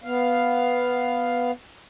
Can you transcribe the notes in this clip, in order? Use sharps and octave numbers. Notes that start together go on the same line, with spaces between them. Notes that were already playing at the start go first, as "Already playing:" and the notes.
B3 F5